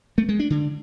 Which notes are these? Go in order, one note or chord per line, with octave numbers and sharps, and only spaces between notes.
A3
G#3
D4
D3